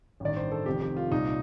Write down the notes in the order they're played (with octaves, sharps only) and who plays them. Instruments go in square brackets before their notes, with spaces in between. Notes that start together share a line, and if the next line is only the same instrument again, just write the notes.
[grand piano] A1 G2 D#3 D5
C5
A4
F1 F2 C3 D#3 G4
G4
F4
C2 A#2 D#4